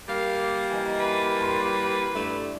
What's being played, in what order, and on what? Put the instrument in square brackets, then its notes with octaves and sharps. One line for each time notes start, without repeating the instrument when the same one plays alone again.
[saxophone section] G3 A#3 [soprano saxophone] F5
[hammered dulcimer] E3 D#4
[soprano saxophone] B4
[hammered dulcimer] G2 A5 C6
[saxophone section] G2 A3 [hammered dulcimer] D5